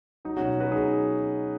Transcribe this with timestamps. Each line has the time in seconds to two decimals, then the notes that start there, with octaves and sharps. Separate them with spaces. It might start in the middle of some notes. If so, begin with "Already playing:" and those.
0.25 F#3 D#4
0.37 B2 C#4 F#4
0.57 F#3 F#4 B4
0.72 B2 D#4 G#4
0.88 F#3